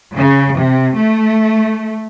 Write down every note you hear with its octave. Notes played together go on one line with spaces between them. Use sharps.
C#3
C3
A3